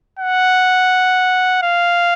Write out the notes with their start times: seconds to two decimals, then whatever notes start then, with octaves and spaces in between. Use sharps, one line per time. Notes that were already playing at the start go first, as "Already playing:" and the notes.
0.19 F#5
1.63 F5